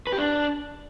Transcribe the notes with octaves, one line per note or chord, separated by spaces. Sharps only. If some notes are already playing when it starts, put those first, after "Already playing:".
B4
G4
D4